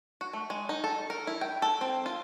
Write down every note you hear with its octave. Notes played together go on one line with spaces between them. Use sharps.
F#4
A3
G#3
D#4
A4
A#4
E4
G5
A4
C4
F4